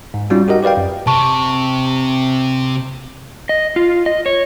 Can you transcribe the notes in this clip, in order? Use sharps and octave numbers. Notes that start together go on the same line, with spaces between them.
G#2
G3 C#4 D#4 F4 F#4
F#4 G4 A#4 D#5 F#5
G4 B4 D5 F5 G5
F#2
C3 A5 C#6
D#5
F4
D#5
C#5